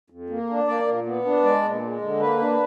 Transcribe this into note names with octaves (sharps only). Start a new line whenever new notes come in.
F2
A#3
D4
A#3 D5
A#2
B3
D4
G#3 D5
A#2
G#3
D3
A#3 B4
D4